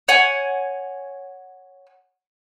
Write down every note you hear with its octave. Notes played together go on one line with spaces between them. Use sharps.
C#5 F#5 G#5